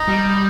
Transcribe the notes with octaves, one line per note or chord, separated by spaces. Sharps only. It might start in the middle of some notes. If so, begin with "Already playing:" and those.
Already playing: D#4
G3